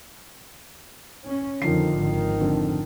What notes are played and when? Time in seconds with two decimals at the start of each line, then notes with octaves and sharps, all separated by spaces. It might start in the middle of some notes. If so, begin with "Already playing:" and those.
1.25 C#4
1.62 F2 D3 D#3 F3 C7
1.98 G#1 D#3
2.41 F2 D3